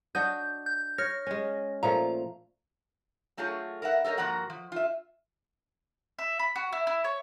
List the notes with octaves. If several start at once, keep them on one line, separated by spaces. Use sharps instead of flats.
D4 F#4 D#5 G6
G6
C#5 F6 A#6
G#3 C#4
A#2 F3 A3 A#5
F#3 A3 F4 G#4 C#5
A#4 B4 E5 F#5
A4 A#4 C5 C#5 D#5
G2 F3 A#3 F#4 F#5 A#5
F3
F4 E5
E5
B5
F#4
E4
E4
C#5